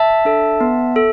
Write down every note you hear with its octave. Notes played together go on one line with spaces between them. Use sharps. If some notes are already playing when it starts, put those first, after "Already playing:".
Already playing: E5 A5
D4 A4
B3
A4